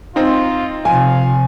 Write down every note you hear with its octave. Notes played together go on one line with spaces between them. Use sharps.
C4 D#4 F4
C3 F3 F5 G#5